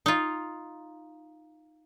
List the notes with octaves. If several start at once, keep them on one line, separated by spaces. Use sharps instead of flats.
D#4 F4